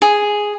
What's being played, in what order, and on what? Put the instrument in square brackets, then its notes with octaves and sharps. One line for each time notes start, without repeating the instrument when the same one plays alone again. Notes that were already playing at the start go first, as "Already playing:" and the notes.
[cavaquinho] G#4